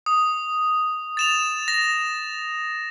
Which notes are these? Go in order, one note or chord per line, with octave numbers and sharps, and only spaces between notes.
D#6
A6 E7 F7
A#6